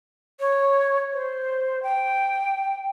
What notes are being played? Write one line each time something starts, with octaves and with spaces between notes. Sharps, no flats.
C#5
C5
G5